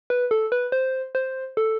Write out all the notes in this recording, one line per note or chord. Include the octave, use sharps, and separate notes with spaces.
B4
A4
B4
C5
C5
A4